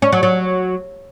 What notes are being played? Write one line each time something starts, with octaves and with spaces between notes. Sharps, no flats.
C#4
F#3
F#3